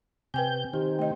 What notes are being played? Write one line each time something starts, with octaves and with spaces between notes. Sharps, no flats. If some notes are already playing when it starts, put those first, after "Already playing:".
C3 B4 G5 G#5 G6
D#3 C4 G4
A3 D#5